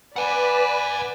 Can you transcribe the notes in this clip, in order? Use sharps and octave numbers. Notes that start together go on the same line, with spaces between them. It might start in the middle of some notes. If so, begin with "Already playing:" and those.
B4 D5 F#5 G#5